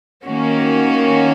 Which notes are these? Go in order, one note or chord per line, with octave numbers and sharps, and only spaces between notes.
D#3 A#3 C#4 F#4